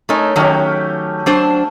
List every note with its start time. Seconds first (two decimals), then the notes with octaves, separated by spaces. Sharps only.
0.09 A3 D#4 A#4 C#5 G#5
0.36 D#3 F#3 A3 C#4 G4
1.26 F#3 D4 C5